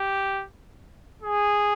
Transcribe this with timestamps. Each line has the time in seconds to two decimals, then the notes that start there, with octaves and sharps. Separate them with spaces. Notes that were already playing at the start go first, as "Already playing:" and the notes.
Already playing: G4
1.22 G#4